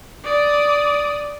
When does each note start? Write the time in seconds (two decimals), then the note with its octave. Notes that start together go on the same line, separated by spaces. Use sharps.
0.24 D5 D#6